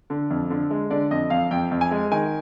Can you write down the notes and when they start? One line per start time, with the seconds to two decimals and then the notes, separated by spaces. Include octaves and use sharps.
0.10 D3
0.30 F2
0.50 D3
0.70 G#3
0.90 D3 D5
1.11 F2 D#5
1.30 F2 F5
1.51 F2 G5
1.71 F2
1.81 G#5
1.91 G#3
2.11 D#3 G#5